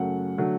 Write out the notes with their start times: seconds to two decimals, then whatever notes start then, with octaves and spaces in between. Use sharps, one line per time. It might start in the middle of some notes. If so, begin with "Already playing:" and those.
Already playing: F#2 C#3 F#3 A3 F#5
0.38 D3 F#3 A3